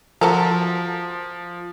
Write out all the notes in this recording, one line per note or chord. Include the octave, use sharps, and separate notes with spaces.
F3 F#4 A4 A#4